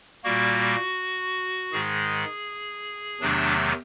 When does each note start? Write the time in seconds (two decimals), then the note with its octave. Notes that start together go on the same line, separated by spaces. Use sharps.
0.24 A#2 G3 A#3 F#4
1.72 G#2 D#3 G#3 G#4
3.21 E2 C3 D#3 F#3 A3 D4